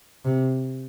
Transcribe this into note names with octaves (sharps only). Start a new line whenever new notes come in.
C3